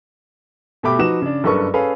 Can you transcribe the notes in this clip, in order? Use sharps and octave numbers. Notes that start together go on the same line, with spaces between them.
B2 A3 G4 B5 D6
F3 D#4 F#4 B4 E7
C#3 D4
F#1 G2 A4 B4 C#6
C#4 G#4 A4 B4 F5